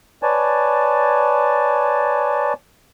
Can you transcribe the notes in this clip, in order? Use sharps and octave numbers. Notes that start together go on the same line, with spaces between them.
B4 C#5 D5 G#5 A5